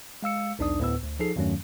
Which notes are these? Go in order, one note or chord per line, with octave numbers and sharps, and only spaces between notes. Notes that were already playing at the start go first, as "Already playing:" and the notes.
G#3 F5 E6 C#7
B1 E2 D4 D#4 D5 D#6
D2 A2 B3 B4 E6
D2
F3 D#4 G#4 A4 C7
E2 G2 D#3 F#3 A3 C#4